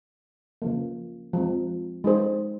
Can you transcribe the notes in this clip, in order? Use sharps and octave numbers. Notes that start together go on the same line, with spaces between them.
C#3 F3 A#3
F3 G#3 C4
G#3 D#4 G#4 C5